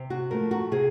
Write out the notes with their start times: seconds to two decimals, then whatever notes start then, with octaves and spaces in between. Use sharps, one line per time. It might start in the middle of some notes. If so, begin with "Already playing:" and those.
Already playing: C3
0.10 F#4
0.30 F3 A3 A#4
0.51 F#4
0.72 C3 G#4